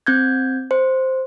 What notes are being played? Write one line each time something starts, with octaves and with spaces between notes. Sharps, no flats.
C4 G6 G#6
C5